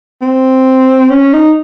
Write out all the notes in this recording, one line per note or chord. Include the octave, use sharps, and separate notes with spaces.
C4
C#4
D#4